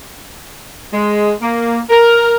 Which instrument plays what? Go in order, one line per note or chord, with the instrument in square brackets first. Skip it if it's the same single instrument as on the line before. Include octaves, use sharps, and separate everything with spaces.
[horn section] G#3
A#3
A#4